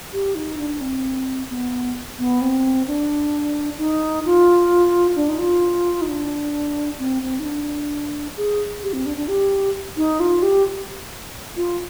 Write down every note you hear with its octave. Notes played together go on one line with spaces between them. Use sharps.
G4
D#4
D4
C4
B3
B3
C4
D4
D#4
F4
D4
D#4
F4
D#4
D4
C4
C4
D#4
D4
G#4
G4
C4
D4
D4
G4
D#4
F4
G4
F4